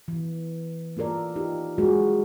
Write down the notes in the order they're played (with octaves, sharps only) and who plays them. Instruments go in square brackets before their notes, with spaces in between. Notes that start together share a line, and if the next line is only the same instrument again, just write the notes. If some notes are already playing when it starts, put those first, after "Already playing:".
[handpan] E3
A#3 F4 A4 A#4 D5
D#4 F4 G4
G3 G#3 A#3 F#4 G#4